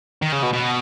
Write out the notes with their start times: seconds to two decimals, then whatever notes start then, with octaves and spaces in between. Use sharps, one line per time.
0.22 D#3
0.32 C#3
0.43 B2
0.53 B2